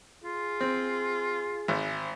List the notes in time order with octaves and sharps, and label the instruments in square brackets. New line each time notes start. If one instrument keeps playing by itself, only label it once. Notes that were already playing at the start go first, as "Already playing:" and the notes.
[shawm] F4 [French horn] G#4
[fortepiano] C4
G#1